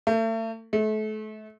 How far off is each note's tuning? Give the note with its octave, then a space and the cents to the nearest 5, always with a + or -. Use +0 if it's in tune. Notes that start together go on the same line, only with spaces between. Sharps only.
A3 +35
A3 -35